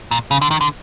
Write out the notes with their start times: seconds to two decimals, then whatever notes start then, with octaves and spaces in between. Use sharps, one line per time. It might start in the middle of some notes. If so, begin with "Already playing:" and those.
0.11 A#2
0.31 C#3
0.41 D3
0.51 D#3
0.61 D3